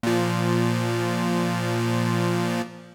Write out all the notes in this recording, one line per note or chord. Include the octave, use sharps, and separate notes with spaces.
A#2 F3